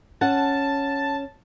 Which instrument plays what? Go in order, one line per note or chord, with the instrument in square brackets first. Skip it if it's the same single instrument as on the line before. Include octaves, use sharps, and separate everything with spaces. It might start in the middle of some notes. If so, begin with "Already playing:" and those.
[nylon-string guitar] C#4 F#5 [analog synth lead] A5